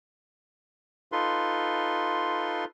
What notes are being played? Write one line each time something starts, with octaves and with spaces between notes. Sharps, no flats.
D#4 F4 A4 B4 C6